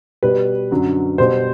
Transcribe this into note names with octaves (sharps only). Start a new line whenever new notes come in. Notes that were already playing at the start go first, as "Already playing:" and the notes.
B2 G3 B4
F#2 D3 F#3
B2 G3 C5